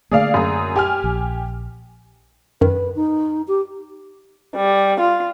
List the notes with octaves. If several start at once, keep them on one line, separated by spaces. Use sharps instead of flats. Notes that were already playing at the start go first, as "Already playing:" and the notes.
D3 A3 A#3 G#4 D5 F5
F#2 G#4
G4 G#5 F6
A#1
F#2 D#3 B4
D#4
G4
G3
F4